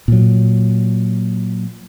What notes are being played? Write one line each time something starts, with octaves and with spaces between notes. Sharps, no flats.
A#2 F#3